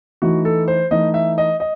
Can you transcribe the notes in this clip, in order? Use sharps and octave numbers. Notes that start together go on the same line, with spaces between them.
E3 A3 D#4 F#4
A4
C5
E3 A3 D#4 D#5
E5
D#5
D#5